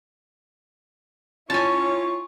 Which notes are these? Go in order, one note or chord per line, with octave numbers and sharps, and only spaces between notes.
C#4 E4 F4 G#5 A5 C#6